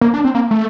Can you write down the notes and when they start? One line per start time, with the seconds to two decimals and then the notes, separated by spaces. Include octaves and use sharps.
0.01 A#3
0.14 D4
0.24 C4
0.35 A#3
0.51 A3